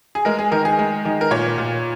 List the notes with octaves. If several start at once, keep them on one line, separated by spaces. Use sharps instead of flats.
G#4
G#3 A#4
G#4
D#3 A#4
G#4
G#3
D#3
A#4
A#2 C#5
A#2